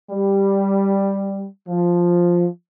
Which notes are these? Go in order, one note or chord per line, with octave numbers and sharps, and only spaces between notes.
G3
F3